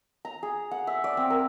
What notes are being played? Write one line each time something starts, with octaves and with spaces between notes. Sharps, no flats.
A#5
G#4
F#5
E5
D5
C4
A#4